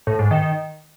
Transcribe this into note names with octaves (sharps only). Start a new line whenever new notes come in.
A2
G#2
D#3